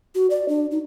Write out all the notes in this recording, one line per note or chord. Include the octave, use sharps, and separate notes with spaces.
F#4
D5
D4
D#4